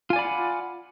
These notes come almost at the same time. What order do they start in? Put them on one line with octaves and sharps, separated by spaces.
F4 G#5 D5 B5 F#5